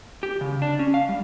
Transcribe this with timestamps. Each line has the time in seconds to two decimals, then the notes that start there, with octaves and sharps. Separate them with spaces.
0.23 G4
0.41 C#3
0.62 D4
0.79 C#4
0.94 F5
1.09 G3